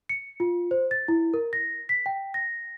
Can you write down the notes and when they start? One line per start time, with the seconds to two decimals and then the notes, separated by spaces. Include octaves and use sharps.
0.09 C#7
0.40 F4
0.71 C5
0.91 A6
1.08 E4
1.34 A#4
1.53 A#6
1.89 B6
2.06 G5
2.34 A#6